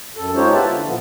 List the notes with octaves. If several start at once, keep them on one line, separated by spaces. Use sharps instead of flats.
F#2 A4
G#3 D#4 F4 G4 C5 C#5
B3 E4 F4 B4 E5 A5
D3
A#2 F3 B3